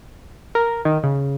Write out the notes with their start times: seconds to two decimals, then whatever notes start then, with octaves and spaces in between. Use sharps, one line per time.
0.55 A#4
0.85 D#3
1.04 C#3